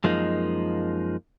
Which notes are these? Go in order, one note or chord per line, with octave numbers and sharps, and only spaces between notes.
F#2 F3 G#3 A#3 D#4